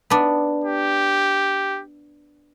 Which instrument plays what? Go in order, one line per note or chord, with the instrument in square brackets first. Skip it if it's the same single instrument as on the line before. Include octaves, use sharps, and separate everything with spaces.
[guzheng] B3 D4
[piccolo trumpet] G4